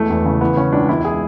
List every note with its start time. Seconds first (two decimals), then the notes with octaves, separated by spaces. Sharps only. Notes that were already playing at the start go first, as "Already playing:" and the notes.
Already playing: E1 E3 A3
0.10 E2
0.25 C#3
0.41 E3 B3
0.57 C#3 C#4
0.73 C#2 D4
0.89 E1 E4
1.05 G#4